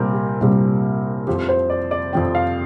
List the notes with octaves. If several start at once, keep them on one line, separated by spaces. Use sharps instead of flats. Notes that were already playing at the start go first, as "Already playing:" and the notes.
Already playing: C2 A#2 G3 C4 A#4
G4
C2 A#2 G3 C4
F2 F3 C4 G4
C5
D5
D5
F2 F3 C4 G5
F5